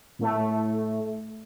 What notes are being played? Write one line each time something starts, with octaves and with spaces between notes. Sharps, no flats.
A2 A3